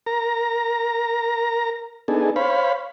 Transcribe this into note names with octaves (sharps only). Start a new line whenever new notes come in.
A#4 A#5
B3 D4 D#4 G#4 A4
C5 C#5 F5 B5